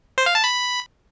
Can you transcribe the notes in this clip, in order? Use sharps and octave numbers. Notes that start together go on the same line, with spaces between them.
C5
F5
A5
B5